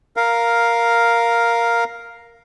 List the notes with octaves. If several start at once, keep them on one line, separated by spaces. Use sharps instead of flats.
A#4 F5